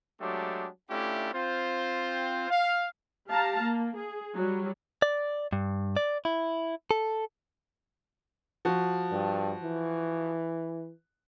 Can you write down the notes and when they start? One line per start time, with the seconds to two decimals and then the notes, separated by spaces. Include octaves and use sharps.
0.21 F#3 G#3 A3 D4 G4
0.90 A3 C#4 D4 E4 F4 G4
1.34 C4 F4 C5
2.50 F5
3.28 G4 F5 A5 A#5
3.62 A#3
3.95 G#4
4.35 F#3 G3
5.02 D5
5.52 G2
5.97 D5
6.25 E4
6.91 A4
8.65 F3 F#4
9.12 G2
9.64 E3